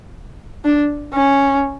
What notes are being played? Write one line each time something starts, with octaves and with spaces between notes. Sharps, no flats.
D4
C#4